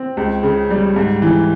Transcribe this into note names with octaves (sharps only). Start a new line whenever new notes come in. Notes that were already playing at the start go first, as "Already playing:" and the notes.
Already playing: C4
C#2
C#3
G3
G#2
E3